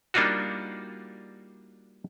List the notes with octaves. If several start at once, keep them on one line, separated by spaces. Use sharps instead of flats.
G3 A#3 D4 D#4 F4 F#4